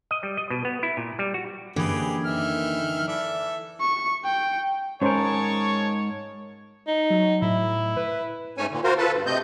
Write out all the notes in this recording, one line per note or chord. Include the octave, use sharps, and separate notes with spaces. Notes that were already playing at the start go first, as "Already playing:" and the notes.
D#5
G3
D#5
B2
B3
E4
A#2
G3
F#4
F#2 D3 E3 A#3 G4 G#4 B4
D#3 E5 F6
E3 A4 D5 E5
C#6
G5
G#2 C#4 G#4 A#4 C5 C#5 A5 C#6
D#4
F#3
A2 E4
B4
G#2 A3 C#4 C#5 G#5
A#2 D3
F4 F#4 A#4 C5
F4 A4 B4 A5
G2
C3 A3 C4 D#5 G6